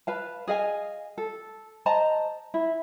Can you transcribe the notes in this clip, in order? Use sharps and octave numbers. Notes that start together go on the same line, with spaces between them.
B4 F5 A5
G#4 D#5 F5 G#5
A4
C5 D#5 A5 A#5
E4